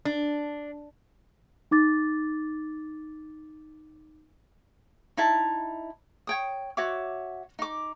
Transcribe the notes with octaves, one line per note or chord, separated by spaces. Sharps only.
D4
D#4 D6 A6
D#4 E4 A5
C#5 G5 D#6
F#4 C#5 E5 D6
D#4 D6